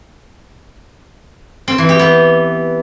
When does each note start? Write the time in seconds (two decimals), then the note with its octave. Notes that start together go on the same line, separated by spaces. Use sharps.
1.68 C4
1.78 E3
1.89 G4
1.99 B3